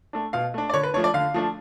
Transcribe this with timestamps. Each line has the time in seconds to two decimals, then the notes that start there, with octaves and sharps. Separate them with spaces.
0.13 A3 D4
0.33 B2 F5
0.54 A3 D4
0.70 D5
0.73 D3 C#5
0.83 B4
0.94 F3 A3 D4 C#5
1.04 D5
1.14 D3 F5
1.34 F3 A3 D4